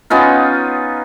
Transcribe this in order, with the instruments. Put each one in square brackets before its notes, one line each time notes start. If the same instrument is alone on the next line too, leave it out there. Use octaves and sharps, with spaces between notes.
[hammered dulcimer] B3 C#4 D#4 F4